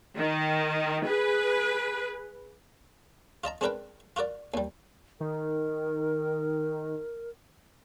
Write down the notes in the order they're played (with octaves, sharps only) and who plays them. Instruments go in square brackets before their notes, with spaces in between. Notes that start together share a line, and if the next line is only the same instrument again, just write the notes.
[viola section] D#3
G#4 B4
[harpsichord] F4 D#5 A5 A#5
G#3 C4 D4 A#4 B4 G5
F4 F#4 A#4 D5
D#2 G3
[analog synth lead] D#3 [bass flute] A#4